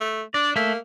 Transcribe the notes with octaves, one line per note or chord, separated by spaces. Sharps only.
A3
D4 D5
A3 A#3 E5